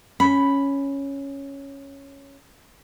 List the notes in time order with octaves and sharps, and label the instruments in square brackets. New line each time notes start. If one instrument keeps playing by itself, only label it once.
[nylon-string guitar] C#4 [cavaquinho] B5